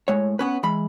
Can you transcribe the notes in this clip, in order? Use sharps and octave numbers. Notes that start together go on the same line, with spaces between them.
A2 G#3 C#5
B3 C#4 B4
E3 G#3 B5